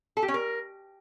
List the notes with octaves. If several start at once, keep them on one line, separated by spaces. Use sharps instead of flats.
A4
G4
C#4
A#4